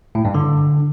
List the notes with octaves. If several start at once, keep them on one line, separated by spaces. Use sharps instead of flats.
A2
G2
D3